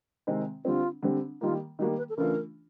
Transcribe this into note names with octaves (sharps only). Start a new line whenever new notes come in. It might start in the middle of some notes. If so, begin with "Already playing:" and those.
C3 D#3 G#3 C4
D3 G3 C4 F4
D3 G3 C4
D#3 G3 A#3 F4
D#3 G3 A#3 F#4
B4
A4
C#3 E3 A3 D4 F4 A#4